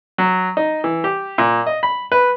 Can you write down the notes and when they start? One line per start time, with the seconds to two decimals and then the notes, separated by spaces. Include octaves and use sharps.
0.18 F#3
0.57 D#4
0.84 E3
1.04 G4
1.38 A#2
1.66 D#5
1.83 B5
2.12 B4